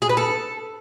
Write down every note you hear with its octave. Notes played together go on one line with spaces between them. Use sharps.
G#4
B4
A4